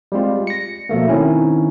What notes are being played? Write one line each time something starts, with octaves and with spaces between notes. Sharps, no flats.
G3 G#3 C4 F4
A#6 C#7
B2 F3 A3 A#3
D#3 C4 C#4 E4